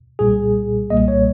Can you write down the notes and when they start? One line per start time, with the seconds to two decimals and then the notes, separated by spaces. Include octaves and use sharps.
0.19 C2 A#2 G3 G#4
0.90 C2 A#2 G3 A#3 D#5
1.08 C#5